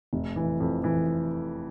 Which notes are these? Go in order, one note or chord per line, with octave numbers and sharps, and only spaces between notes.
F1
E3
F2
E3